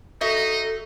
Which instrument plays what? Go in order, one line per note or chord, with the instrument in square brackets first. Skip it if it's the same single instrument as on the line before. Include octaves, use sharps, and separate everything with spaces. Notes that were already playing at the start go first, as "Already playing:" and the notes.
[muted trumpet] D#4 [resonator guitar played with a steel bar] F#4 D#5 E5 [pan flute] A4